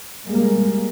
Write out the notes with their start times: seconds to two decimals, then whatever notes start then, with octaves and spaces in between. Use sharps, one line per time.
0.25 G3 G#3 A#3